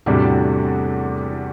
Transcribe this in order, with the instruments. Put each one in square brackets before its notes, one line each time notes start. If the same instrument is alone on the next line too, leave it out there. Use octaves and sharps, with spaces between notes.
[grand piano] E2 C3 G3 D4 F#4 [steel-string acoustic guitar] A2